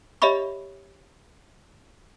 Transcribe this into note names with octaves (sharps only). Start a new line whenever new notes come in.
G4 C#5 D#5 E5 B5 C#6